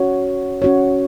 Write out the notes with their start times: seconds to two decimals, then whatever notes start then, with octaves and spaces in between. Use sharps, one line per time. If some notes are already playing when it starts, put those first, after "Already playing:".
Already playing: C#4 F#4 C#5
0.62 C#4 F#4 C#5